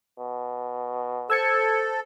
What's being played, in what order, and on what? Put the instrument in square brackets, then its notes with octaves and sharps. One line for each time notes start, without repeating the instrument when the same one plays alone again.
[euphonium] B2
[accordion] A4 [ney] C5 [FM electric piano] E6 G#6 C#7